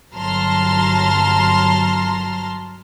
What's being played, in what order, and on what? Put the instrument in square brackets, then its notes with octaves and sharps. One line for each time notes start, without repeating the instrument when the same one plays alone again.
[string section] G1 F#3 A5 A#5 C6 F6